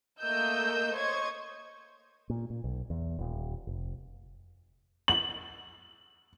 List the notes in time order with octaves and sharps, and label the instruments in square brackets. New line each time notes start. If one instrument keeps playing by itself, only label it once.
[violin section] A3 A#3 A#4 D#5 E6 G6
C5 C#5 D#5 C#6 G#6
[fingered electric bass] A#2
A#2
B1
E2
D#1
F1
[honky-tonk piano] F#7